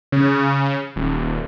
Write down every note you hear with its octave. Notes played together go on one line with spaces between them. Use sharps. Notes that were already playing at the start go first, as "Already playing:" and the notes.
C#3
D#1